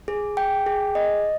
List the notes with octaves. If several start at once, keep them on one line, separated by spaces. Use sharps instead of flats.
G#4
G5
G#4
D#5